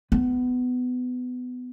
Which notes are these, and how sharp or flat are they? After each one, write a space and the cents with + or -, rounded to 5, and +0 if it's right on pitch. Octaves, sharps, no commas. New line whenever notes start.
B3 +20